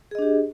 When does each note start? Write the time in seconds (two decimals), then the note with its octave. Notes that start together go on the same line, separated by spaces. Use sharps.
0.11 G#4
0.15 D#5
0.19 D4
0.22 G4